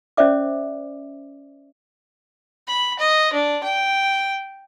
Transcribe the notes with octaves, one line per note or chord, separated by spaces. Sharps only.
C#4 C5 D5 E5 D6
B5
D#5
D4
G5